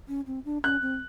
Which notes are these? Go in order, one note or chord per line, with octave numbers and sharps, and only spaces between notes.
C#4
C4
D4
C#4 F#6
C4